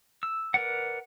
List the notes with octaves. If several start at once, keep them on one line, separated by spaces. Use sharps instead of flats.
E6
A#4 B4 D5 F#5